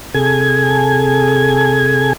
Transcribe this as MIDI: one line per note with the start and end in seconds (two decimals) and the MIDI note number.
0.14 2.13 48
0.14 2.13 68
0.14 2.13 69
0.14 2.13 80
0.14 2.13 92